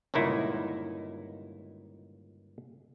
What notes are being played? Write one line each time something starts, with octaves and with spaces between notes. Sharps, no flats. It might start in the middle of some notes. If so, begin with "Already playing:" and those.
G1 C#2 A#2 D#3 D#4 E4